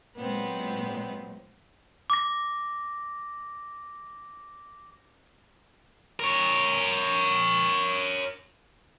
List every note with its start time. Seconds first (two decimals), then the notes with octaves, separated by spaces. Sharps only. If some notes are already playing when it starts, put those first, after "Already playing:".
0.16 A#2 F#3 G#3 B3 C4
2.10 D6 A#6
6.20 A#4 C#5